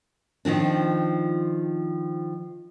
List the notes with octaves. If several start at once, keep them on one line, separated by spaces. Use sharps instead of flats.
D#3 F3 C4 D4